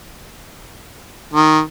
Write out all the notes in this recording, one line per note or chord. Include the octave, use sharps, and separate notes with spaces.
D#3